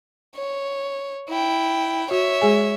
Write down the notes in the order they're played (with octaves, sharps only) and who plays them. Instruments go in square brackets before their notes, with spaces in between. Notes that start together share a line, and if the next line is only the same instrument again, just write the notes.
[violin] C#5
E4 G5
[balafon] F#4 [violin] C#5 E5
[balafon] G#3 G#4 G#5